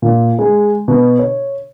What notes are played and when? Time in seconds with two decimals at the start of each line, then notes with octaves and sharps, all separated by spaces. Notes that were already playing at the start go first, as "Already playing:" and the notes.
0.02 A#2
0.39 G#3
0.88 B2
1.19 C#5